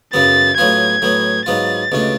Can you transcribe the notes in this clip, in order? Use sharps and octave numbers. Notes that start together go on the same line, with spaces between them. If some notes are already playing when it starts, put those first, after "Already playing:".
F#2 C#3 F#3 B3 A6
A2 F#3 B3 F4 G#6
A2 F#3 B3
G#2 F#3 B3 F4 A6
C#2 B2 A3 D4